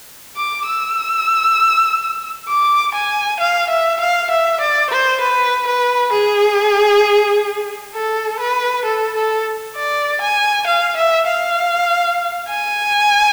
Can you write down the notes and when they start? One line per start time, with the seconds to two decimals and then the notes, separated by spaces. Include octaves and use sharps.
0.37 D6
0.66 E6
2.48 D6
2.94 G#5
3.40 F5
3.70 E5
4.00 F5
4.31 E5
4.60 D5
4.90 C5
5.21 B4
5.67 B4
6.12 G#4
7.94 A4
8.39 B4
8.85 A4
9.15 A4
9.76 D5
10.21 G#5
10.67 F5
10.97 E5
11.28 F5
12.49 G#5